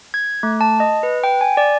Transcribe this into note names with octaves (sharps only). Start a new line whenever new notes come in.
G#6
A3
A5
D#5
B4
G5
G#5
D5